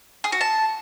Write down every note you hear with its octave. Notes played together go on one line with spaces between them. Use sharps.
G#4
F#4
A5